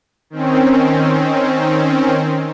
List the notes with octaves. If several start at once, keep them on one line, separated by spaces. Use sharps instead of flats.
D#3 C4 C#4